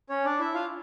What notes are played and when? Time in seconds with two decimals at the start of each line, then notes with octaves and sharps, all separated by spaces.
0.10 C#4 C#5
0.25 D4 D5
0.40 E4 E5
0.54 F4 F5